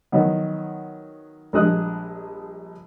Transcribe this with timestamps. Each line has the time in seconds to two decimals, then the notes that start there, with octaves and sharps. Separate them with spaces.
0.12 D#3 F#3 B3
1.53 A#1 G3 G#3 D4 D#6 F#6